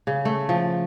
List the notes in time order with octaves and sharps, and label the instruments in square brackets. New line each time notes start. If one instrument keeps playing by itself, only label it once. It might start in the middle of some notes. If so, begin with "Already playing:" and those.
[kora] C#3
A3
F3